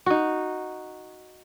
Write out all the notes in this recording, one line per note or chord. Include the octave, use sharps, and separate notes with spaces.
D#4 F#4